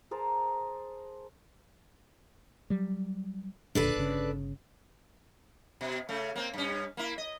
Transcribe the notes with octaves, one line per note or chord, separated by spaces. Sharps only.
G#4 A#4 C5 A5
F#3 G3
E1 A#2 D3 D4 A4 B4
G1 C#3
B2
C#3 A3
A#3 C4
G2 C#4
A#3 E4
D#5